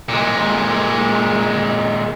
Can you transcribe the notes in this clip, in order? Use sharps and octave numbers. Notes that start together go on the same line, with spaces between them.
A#2 G#3